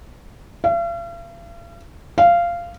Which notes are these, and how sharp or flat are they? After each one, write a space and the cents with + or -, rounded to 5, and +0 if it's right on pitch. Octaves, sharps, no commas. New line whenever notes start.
F5 -45
F5 -15